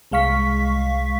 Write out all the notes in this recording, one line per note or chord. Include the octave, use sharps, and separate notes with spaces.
C2 G#3 F5 C#6 B6